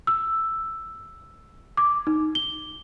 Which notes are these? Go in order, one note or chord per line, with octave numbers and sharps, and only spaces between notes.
E6
D6
D#4
G7